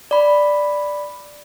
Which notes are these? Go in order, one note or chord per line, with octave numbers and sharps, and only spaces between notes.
D5 B5